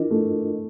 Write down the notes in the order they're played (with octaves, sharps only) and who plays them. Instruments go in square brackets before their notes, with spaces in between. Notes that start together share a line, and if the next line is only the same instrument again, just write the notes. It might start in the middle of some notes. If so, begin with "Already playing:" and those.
Already playing: [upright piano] E3 [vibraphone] D4 F4 A#4 D#5
[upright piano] A3